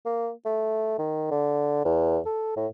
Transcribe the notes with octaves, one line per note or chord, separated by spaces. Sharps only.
A#3
A3
D#3
D3
E2
A4
A2